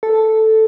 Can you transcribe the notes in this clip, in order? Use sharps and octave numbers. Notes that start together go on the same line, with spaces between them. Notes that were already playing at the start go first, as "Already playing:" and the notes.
A4